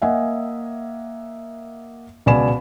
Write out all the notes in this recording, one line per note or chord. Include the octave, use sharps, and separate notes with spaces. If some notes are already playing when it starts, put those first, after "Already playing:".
A#3 D#5 E5 F#5 G#5
C#2 B2 D5 G#5 B5 E7